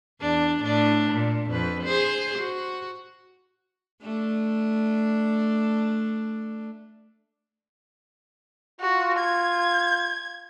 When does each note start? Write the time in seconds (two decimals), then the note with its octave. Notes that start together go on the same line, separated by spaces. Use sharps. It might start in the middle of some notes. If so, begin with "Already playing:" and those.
0.21 E2 D4
0.60 A2 D4
1.11 A#2
1.51 F2 B4
1.84 G#4 C5
2.39 F#4
4.02 A3 D4
8.81 F4 F#4
9.19 G#6